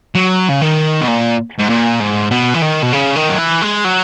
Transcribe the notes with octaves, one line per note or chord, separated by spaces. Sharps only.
F#3
C#3
D#3
B2
A#2
G#2
A#2
G#2
B2
E3
D#3
B2
C#3
D#3
F#3
E3
G#3
F#3